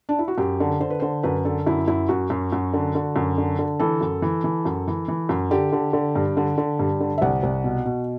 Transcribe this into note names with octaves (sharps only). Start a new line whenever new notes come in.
D4
E4
F#4
F#2 G4
D3
D3 C5
B4
D3 C5
F#2 B4
D3 A4
F#2 E4
F#2 E4
F#2 F#4
F#2
F#2
D3
D3
F#2
D3
D3
E3 A4
F#2
E3
E3
F#2
E3
E3
F#2
D3 G4
D3
D3
G2
D3
D3
G2
D3
E5
C2 F#5
C2
B2
B2